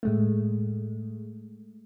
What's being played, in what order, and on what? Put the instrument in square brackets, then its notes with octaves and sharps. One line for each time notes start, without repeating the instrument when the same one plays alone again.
[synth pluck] A2 G#3 A3